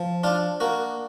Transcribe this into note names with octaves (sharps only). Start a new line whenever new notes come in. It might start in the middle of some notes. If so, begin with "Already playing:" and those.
Already playing: F3
D4 F4
A#3 F#4